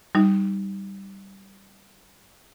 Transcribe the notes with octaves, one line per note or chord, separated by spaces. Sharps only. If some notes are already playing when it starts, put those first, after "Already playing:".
G3 D#4